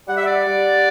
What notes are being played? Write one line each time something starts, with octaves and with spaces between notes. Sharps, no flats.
G3 F#5
E5
D5 F#5
G3